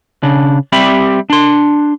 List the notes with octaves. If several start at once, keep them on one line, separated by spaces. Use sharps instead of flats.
C#3 D4
G3 C4 G4 E5 B5
D4 C6